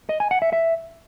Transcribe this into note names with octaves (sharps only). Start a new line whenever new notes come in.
D#5
G#5
F#5
E5
E5